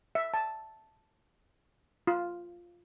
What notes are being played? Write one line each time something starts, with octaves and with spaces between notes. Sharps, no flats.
E5
A5
F4